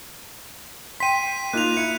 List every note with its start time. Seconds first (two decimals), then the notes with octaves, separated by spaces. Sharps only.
1.00 G5 C6 B6 D#7
1.53 A#3 D#4 F4 F#6 F7
1.77 E4 C#7